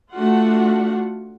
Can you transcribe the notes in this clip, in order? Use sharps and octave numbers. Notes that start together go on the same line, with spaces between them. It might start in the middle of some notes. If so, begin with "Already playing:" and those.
A3 D4 F4 F#4 F#5